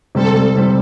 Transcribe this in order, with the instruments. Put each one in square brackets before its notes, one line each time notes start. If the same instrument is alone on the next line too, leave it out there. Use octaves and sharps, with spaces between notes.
[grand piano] C3 G3 C4 [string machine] A4
[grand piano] C3 G3 C4